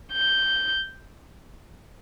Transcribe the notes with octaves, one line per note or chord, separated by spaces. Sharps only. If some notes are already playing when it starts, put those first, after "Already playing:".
G6